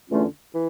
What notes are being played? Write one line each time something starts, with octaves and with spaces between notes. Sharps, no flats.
E2 D3 A3 C#4 F4
E3